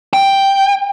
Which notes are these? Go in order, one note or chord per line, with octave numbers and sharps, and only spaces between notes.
G5